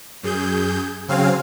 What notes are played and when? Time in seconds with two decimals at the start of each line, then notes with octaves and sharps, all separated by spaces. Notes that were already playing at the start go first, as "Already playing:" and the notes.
0.23 F#2 G#4 G6
1.08 C#3 F#3 C4 F5 G#5